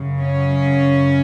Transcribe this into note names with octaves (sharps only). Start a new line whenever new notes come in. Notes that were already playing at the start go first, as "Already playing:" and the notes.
Already playing: F#2 C#3
C#4